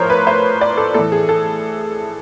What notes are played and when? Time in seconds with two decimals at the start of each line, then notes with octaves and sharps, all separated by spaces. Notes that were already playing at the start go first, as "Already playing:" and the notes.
Already playing: A2 F3 A#4 C5 C#5
0.10 B4
0.27 C5
0.61 D5
0.77 A4
0.94 A2 E3 A4
1.12 G#4
1.29 A4